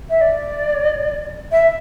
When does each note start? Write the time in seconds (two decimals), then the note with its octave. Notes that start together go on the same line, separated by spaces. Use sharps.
0.10 E5
0.21 D5
1.52 E5